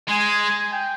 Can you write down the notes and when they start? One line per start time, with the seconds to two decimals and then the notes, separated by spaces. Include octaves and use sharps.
0.09 G#3 G#5
0.73 G5